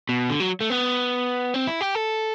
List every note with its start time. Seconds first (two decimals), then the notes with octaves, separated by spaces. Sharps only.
0.09 B2
0.30 D3
0.40 F#3
0.61 A3
0.70 B3
1.54 C4
1.67 E4
1.81 G4
1.95 A4